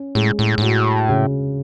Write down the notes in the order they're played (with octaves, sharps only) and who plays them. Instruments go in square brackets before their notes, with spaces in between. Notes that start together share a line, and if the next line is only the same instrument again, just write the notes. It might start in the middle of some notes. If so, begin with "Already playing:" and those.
Already playing: [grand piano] C#4
[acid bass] A2 [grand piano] G#3
[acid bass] A2
G#2
[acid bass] A2 [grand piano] F#4
[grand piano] C#3